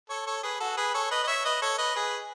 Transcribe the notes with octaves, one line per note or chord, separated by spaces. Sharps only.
A4 C#5
A4 C#5
G#4 B4
F#4 A4
G#4 B4
A4 C#5
B4 D#5
D#5
C#5 E5
B4 D#5
A4 C#5
B4 D#5
G#4 B4